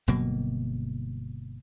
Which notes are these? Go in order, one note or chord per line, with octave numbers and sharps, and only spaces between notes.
G1 B2 F#3 A#3